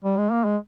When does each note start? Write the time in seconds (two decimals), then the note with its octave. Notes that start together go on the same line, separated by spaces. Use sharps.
0.04 G3
0.17 G#3
0.32 A#3
0.45 G#3